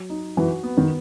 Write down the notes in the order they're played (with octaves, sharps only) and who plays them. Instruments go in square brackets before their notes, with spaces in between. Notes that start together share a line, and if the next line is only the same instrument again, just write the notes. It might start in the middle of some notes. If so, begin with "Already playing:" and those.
Already playing: [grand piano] F#3
D#4
[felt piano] E3 [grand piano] F#4
[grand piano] B3
[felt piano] D#3